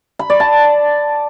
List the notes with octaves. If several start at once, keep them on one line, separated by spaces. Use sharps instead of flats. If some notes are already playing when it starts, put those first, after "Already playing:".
B5
D5
A5